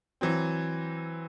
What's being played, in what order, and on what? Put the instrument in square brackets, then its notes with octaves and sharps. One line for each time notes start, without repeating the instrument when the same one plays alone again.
[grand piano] E3 F#3 C4